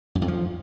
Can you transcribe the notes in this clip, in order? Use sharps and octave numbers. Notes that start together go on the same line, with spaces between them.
F#2
F2
F3